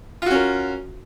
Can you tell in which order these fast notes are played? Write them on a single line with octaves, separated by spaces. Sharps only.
F4 F#4 C#4 A#4